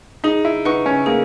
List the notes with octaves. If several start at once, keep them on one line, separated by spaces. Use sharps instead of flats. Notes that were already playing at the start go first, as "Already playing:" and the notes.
D#4 G#4
E4
D#4 B4 F#5 C#6
C#4
A#3 G#4